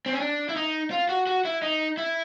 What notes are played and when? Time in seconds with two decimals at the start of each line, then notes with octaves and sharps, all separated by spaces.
0.06 C4
0.13 C#4
0.20 D4
0.49 E4
0.56 D#4
0.91 F4
1.09 F#4
1.27 F#4
1.45 E4
1.62 D#4
1.97 E4